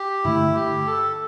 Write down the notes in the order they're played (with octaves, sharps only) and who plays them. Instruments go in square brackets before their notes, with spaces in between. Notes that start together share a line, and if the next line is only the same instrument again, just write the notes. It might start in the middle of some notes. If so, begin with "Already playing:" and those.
Already playing: [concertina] G4
[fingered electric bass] G2 D3 A3 [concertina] E4
[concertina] G4
A4